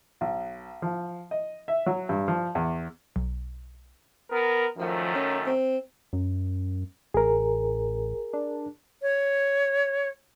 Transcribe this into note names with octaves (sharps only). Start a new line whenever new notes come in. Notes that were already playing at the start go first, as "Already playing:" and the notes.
B1
F3
D#5
E5
F#3
G2
F3
E2
B1
B3 A#4
F#2 D#3 F3 A3
C#4
C4
F#2
A1 G#4 A#4
D4
C#5